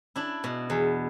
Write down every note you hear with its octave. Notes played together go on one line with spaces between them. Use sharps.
D4 E4
B2
E2